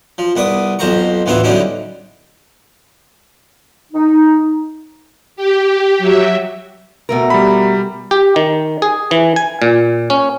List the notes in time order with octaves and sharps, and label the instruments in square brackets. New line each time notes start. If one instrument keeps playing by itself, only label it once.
[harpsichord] F3
C2 B3 B4 D5 D#6
B1 F2 C5 F5 A#5 C#6
A1 D2 E3 B3 F4 E5
D3 F#3 G3 C#4 D#4 E4
[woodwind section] D#4
[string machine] G4
F#3 E5
[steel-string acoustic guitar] B2 A3 A#4
[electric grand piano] G3 B5
[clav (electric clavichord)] G4
D#3
G#4
E3
G#5
A#2
C#4